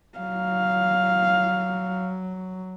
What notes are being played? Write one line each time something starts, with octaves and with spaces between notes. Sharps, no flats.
F#3 F5